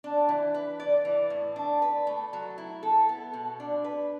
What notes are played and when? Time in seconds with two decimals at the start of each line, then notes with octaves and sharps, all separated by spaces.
0.04 D4
0.29 E3
0.54 B4
0.80 D5
1.05 E3
1.30 A2
1.56 D4
1.82 B4
2.07 A3
2.33 F#3
2.58 E4
2.83 A4
3.09 B3
3.33 B2
3.60 D4
3.84 B4